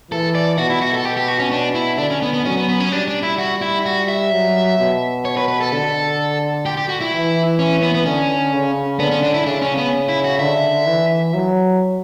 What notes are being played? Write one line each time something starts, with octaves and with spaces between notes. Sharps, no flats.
E3 A4
D5
B2 F#4
E4
F#4
A4
B2 G4
G4
F#4
C#4
D4
E4
D3 D4
C#4
B3
B3
F#3 C#4
B3
B3
C#4
G3 D4
D4
E4
F#4
E4
F#4
E5
F#3
B2
C#5
B4
B4
A4
D3 A4
G4
G4
F#4
E4
E3
C#4
B3
B3
D3 C#4
C#3
D3 B3
C#4
D4
E4
C#3 D4
C#4
B3
E4
F#4
D3 E5
E3
F#3